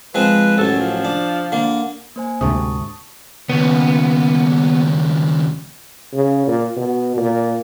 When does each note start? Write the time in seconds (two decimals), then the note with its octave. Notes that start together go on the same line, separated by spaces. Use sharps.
0.15 F3 G#3 C4 B4
0.58 A1 F#2 A4
0.78 F3
1.05 D4
1.52 D3 A#3
2.16 A#3 C5 G#5
2.41 D2 G#2 C3 A5 C#6 D#6
3.50 D#2 C#3 B3
6.13 C#3
6.47 A#2
6.77 B2
7.17 A#2